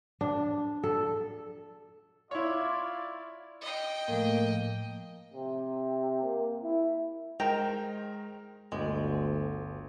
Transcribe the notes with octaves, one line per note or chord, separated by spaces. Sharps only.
D4
A4
E4 F4 C#5 D5
D#5 G5
A2 F3 A3 A#3
C3
A#3
E4
D#3 G#3 A#4 C5 G5 A#5
G1 D2 G#3